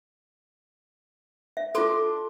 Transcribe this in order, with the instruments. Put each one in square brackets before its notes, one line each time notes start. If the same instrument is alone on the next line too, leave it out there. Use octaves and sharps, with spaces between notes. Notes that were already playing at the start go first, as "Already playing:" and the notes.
[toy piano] E5
[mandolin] D4 C6 D6 [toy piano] F4 A4